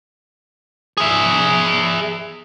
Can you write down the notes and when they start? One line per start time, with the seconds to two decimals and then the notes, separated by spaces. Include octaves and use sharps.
0.97 G#4 E5